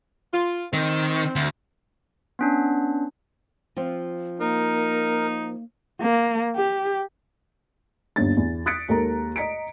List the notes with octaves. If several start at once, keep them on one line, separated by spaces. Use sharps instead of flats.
F4
D#3 C4
D2
B3 C#4 D4
F3 C4 F4
A#3 D#4 A#4
A#3
G4
G1 D#2 D4 A6
E2
D#6 F#6 A6 B6 C#7 D7
D#2 G#3 A4 A#4 A#5
D#5 A#5 B6 C#7 D7